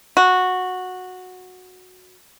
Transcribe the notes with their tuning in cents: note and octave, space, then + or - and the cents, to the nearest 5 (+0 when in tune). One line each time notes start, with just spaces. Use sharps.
F#4 -10